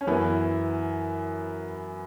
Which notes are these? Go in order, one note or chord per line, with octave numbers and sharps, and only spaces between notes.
C#4
F#2 E3 B3 E4